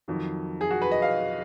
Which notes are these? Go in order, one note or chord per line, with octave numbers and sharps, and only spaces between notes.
F2 D#3 F#3
G#4
F#4
B4
D#5
F5